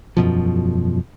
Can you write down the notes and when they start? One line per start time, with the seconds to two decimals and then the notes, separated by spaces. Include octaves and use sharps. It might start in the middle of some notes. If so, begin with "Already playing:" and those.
0.17 E1 F#2 B2 F3